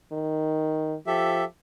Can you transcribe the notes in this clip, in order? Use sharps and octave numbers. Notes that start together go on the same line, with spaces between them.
D#3
F3 G4 A4 E5